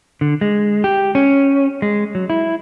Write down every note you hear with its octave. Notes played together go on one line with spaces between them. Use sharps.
D3
G#3
G4
C#4
G#3
F#3
E4